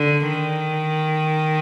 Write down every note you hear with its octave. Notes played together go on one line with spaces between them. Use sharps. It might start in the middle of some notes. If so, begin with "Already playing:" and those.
Already playing: D3
D#3